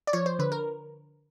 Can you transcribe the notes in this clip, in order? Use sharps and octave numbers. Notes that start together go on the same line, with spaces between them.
D5
F3 C#5
C5
D3 B4
A#4